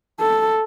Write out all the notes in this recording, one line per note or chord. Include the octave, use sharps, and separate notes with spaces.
A4